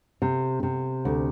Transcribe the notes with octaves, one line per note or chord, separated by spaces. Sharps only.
C3
C3
D2